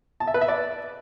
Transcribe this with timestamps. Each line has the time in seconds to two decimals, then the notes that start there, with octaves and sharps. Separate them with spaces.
0.20 A5
0.27 E5
0.34 B4
0.41 E5
0.48 D5